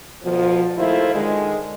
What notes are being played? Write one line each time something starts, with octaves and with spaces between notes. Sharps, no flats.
D2 B2 F3
D#2 A3 E4 F4 C5
D3 D#3 G#3